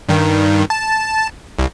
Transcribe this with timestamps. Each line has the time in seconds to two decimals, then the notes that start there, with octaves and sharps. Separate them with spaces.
0.08 G2 D#3
0.70 A5
1.59 C2